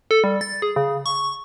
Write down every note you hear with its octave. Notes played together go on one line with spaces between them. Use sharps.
A4
G3
A6
G#4
C#3
C#6